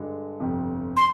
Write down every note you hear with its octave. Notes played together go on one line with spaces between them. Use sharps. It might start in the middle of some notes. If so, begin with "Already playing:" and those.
Already playing: G2 D3 G#3
G1 F2 C3 F3
C6